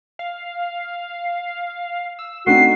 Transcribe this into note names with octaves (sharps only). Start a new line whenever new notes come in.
F5
E6
A3 C4 D4 D#4 F#4 C7